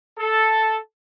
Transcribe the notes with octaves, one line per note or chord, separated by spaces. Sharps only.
A4